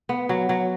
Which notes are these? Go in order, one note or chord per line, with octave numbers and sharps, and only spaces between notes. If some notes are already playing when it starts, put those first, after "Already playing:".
B3
F#3
F#3